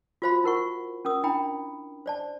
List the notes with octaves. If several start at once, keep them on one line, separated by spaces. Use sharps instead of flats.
F4 F#4 C5 F5 B5
E4 A#4 F#5 C#6
C#4 A#4 D#6
D4 E4 G5 A#5 B5
C5 D5 A5